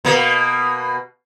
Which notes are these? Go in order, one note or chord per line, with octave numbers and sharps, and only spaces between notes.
B2 A#3